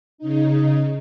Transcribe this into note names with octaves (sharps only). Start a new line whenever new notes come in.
C#3 D#4